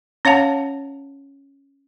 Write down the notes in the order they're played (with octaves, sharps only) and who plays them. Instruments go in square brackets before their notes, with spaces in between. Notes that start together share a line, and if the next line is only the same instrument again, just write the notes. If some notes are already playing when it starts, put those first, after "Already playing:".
[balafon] C#4 C#5 F5 F#5 A5